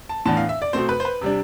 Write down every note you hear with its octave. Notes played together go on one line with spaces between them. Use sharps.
A5
A2 E3 B3 D4 A5
F5
E5
D5
B2 A3 C4 C5
B4
C5
B4
C3 G3 D4